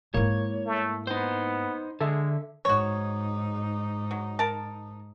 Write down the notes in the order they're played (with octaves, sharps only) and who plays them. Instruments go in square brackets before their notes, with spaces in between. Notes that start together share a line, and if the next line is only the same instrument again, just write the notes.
[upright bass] G#2 E4 [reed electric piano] A#3 [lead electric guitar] C#5
[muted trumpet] A3
[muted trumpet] B3 [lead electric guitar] D#4 C5
[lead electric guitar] D3 [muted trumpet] G#3 [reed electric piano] A4 E5
[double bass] G#2 D#4 [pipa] F#4 C#5
[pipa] F#3
A#4 A5